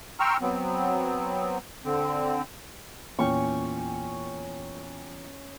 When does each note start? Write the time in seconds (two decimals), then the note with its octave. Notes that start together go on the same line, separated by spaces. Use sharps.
0.20 G5 A#5 C6 C#6 E6 F6
0.41 F#3 B3 C4
1.85 D3 C4
3.19 E2 A#2 C#4 G5 C#6